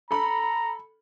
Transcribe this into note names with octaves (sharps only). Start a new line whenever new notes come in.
A4 A#5 B5